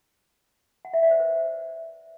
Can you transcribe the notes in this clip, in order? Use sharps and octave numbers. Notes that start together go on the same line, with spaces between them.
F#5
E5
D5
C5
B4